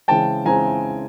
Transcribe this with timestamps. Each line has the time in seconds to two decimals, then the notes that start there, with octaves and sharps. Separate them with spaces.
0.08 C#3 E3 G#3 C4 G5 A5
0.45 C#3 E3 G#3 C4 G#5 A#5